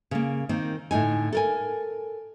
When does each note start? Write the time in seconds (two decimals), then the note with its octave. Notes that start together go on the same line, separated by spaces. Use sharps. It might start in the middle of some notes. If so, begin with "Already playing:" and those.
0.11 C#3 A#3
0.49 D#3 A#3 C4
0.91 A2 D3 D#4 G#5
1.32 A4 A#4 G#5